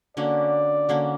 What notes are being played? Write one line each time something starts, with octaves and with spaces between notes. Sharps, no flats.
D3 A#3 C#4 F#4 D5
D3 A#3 C#4 F#4